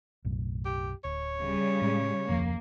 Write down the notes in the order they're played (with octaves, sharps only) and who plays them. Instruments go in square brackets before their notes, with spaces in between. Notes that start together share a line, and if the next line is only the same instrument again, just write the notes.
[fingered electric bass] B1 F#2 A2
[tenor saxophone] G4
[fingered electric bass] D1 [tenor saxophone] C#5
[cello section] C#3 G3
[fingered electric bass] A2 G#3
[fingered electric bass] D1 F2 F3 [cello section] A#3